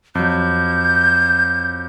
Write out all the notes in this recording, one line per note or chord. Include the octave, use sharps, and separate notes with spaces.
F2 F#3 G6